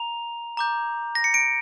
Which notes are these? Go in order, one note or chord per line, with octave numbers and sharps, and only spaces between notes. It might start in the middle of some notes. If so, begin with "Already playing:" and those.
Already playing: A#5 F7
A#5 D6 G6
A#6
C#7
D7